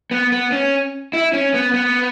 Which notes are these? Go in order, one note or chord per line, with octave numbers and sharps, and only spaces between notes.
B3
B3
C#4
E4
C#4
B3
B3